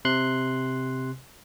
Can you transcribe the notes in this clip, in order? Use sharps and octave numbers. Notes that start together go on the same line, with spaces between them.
C3 C6 F#6